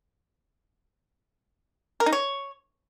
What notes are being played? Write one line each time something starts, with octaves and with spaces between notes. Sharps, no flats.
A#4
D#4
C#5